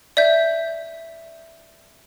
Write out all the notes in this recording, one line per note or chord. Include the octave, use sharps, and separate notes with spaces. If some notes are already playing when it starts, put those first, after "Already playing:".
D5 E5 G6